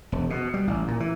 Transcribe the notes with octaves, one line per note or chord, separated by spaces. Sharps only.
E1
B2
G3
A1
A#2
E3